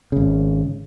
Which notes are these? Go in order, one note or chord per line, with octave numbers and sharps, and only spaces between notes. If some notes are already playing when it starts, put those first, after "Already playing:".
G#1 C#3